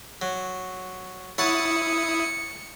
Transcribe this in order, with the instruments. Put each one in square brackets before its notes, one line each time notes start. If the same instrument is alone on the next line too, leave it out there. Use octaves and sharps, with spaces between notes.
[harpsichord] F#3
[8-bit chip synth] E4 D#6 [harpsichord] C#5 F#5 A5 [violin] C#7